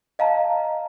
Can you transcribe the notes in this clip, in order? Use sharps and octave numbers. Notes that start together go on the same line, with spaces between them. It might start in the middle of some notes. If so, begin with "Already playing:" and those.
D#5 F5 A5 A#5